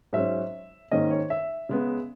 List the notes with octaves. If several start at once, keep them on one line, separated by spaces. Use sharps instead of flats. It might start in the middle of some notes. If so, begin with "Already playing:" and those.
G#2 F#3 C#4 E5
G#2 D#3 A#3 C#4 D#5
C#5
E5
C#3 G#3 B3